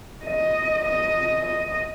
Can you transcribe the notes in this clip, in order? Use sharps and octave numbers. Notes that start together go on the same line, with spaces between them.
D#5
D#5
D#5